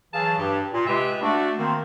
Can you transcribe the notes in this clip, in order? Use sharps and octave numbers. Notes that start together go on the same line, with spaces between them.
E3 F#3 G#4 F5 A5
G2 G4
A#2
C3 G#3 F4 G4 B4 E5
A3 D4 F#4
D#3 A#3 C4